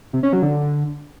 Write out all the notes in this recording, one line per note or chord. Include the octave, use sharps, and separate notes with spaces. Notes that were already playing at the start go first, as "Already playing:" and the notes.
C3
C#4
F#3
D3